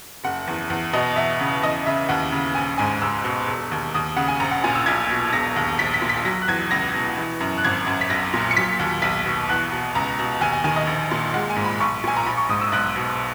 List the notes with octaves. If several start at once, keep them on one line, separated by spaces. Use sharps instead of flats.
F#1 F#5
E2
E2
B2 D#5
E2 E5
C#3
E2 D#5
C#3 E5
D#2 F#5
C#3
A#1 G#5
G#2 G#5
C#2 E6
B2
E1
D#2
D#2 D#6
C#3 F#5
G#5
A#1 A#5
F#5
A#2 G#5
E6
B1 G#6
B2
E1 A#6
D#2
A#1 B6
B6
A#2
B6
F#3 A#6
F#6
E2 G#6
C#2 A#6
B2
E3
F#2
F#6
G#1 G#6
F#2
B6
B1 A#6
A#2
C#7
F#3 B6
D#2
B1 B6
B2
E2 F#6
B2
C#2 A#5
B2
D#2 G#5
G#5
D#3 G#5
D#5
A#1
A#2
G#3 F#5
G#5
G#2
B5
B1 C#6
A#2 G#5
A#5
A#1 B5
C#6
G#2 D#6
E6
B1 F#6
B2